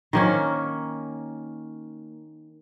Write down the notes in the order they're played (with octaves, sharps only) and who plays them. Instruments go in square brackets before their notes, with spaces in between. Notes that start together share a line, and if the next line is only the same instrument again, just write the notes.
[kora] D#3 A#3 C#4